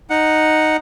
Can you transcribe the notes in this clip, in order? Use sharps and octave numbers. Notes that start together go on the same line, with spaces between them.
D#4 F#5